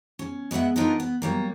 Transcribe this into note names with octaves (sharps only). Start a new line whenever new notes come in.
C#4
G#3 B3 C#5 E5 F#5
B3 D4 D#4 F4 A#4
B3
F#3 G3 A#3